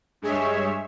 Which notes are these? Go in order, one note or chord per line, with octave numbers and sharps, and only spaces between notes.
G2 G#3 G#4 C#5 E5